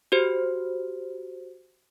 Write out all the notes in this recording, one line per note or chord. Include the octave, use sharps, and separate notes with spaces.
F#4 G4 C5